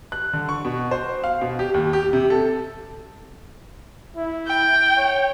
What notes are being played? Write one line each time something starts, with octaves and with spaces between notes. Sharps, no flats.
F#6
D3
C#6
B2
C5
F5
B2
G4
D#2
G4
C3
A4
E4
G5
C#5